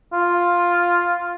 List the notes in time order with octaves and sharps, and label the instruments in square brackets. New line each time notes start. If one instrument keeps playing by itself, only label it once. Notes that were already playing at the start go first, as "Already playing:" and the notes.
[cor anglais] F4